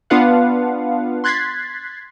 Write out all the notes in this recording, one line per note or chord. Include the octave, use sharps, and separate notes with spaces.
B3 D4 F4 B4 F5 F#5
C6 F#6 G#6 A6 B6 C7